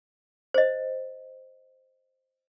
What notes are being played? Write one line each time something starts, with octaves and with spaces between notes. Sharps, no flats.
C5 D#5